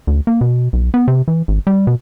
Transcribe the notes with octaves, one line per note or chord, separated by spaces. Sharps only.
D2
A#3
B2
B1
B3
C3
E3
G#1
G3
B2